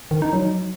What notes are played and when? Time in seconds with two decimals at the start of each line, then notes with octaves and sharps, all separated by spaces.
0.11 D#3
0.22 D#4
0.33 F#3